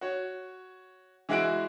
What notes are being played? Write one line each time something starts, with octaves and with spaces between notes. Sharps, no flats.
F#4 C#5
E3 G#3 E4 F#4 F#6 D7